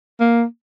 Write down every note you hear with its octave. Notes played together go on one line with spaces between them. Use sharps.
A#3